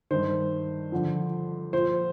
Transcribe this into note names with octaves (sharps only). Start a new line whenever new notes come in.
G2 D#3 C5
F2 D3 F3
A#2 F3 C5